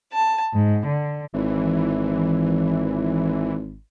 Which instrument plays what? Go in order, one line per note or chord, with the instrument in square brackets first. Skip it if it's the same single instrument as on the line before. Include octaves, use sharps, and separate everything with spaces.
[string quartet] A5
G#2
D3
[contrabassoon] G#1 [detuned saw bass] E3